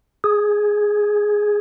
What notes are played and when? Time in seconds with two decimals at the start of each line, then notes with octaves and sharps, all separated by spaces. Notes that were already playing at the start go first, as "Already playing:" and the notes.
0.24 G#4